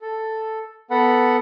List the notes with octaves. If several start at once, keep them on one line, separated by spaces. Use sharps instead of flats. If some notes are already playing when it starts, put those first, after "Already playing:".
A4
B3 A4 F#5 B5